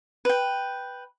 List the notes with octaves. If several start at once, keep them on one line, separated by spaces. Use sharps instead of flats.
B4 G5